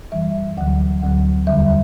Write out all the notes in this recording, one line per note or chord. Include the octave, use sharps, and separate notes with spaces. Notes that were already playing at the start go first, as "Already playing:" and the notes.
F#2 E3 G3 E5
D2 D3 F#3 F#5
D2 D3 F#3 F#5
E2 D3 G3 E5